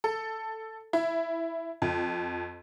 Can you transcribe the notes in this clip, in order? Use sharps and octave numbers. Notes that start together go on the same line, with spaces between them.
A4
E4
F2